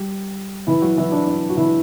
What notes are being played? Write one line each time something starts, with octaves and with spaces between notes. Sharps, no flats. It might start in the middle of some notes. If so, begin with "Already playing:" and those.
Already playing: G3 G4
E3 E4
F#3 F#4
E3 E4
D4
D4
F#4
E3 E4